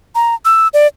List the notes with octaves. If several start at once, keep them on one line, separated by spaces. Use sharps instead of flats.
A#5
E6
D5